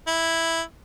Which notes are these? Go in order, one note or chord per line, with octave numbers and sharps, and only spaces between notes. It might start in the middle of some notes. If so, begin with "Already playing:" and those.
E4